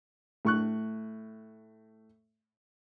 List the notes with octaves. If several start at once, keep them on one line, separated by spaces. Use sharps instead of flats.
A2 C#6 F#6